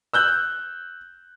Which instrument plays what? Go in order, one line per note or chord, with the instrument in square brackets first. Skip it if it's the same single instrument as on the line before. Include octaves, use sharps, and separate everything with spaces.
[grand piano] E6 F#6 G6